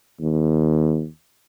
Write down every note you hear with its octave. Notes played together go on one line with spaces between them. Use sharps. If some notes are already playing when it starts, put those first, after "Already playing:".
D#2